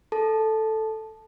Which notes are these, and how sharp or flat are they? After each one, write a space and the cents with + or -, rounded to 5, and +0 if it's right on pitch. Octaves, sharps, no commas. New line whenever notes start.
A4 +0 A5 -10